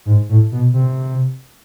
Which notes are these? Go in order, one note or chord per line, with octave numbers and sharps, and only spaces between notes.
G#2
A2
B2
C3